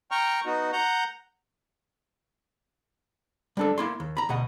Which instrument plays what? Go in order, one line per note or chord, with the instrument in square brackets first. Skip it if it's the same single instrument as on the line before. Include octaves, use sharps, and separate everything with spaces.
[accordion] G5 A#5 C#6 F6
B3 D#4 F#4
F#5 A#5 G6
[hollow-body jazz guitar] G3 D4 A4
A#3 E4 C6
D#2
A#5 B5
D2 B2 D#5 F#5